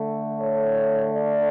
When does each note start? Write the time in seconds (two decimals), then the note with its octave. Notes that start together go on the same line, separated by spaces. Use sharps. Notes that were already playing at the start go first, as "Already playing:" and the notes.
Already playing: D3 A3
0.41 C#5
1.17 D5